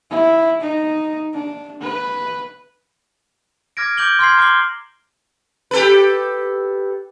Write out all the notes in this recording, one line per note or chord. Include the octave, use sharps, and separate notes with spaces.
E4
D#4
D4
B4
D6 F6 G#6 A#6 D7
D6 G6 D7 F#7 G7
C6 F6 G#6 C7
A#5 D6 F6 C7 G7
G4 A4 B4